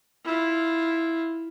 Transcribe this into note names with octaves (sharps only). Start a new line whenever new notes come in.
E4 F4